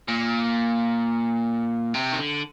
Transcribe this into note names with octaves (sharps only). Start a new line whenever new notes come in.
A#2
C3
D#3
D3